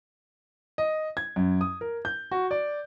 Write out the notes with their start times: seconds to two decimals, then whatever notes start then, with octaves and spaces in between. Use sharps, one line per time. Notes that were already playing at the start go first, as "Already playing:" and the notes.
0.78 D#5
1.17 G#6
1.36 F#2
1.61 D#6
1.81 A#4
2.05 G6
2.31 F#4
2.51 D5